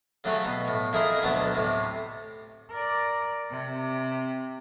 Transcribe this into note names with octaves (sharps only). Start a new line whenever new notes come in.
C#3 F#3 A3 C4 C#4
B2
A2
F2 E4 G#4 A#4 D#5 A#5
D2 B2 F#3 A5
A2 C3
A#4 D5
C3